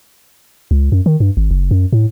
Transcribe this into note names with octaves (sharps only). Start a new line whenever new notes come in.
C#2
F#2
D#3
G2
G#1
F#1
F#2
A2